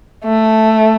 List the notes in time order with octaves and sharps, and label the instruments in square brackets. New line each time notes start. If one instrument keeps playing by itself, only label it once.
[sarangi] A3